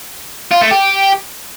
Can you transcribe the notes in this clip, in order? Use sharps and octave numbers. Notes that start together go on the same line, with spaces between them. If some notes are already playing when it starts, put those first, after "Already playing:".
F4
A3
G4